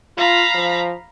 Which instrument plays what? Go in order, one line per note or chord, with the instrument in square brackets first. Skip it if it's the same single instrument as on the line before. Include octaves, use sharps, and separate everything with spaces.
[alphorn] F4 [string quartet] F5 A#5 B5
[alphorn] F3